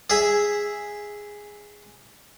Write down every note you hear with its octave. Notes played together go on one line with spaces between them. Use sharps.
G#4 E5